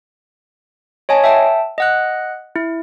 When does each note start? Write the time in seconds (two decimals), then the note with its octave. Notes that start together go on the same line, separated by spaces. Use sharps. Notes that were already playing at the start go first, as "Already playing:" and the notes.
1.09 C#5 D#5 G#5 A5
1.24 E5 G5 A5
1.78 D#5 F#5 F#6
2.56 E4